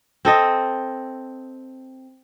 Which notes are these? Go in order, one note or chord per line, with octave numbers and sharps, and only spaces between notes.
C4 A4 D#5